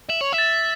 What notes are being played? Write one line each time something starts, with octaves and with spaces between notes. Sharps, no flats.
E5 F#7
C#5
E5
A6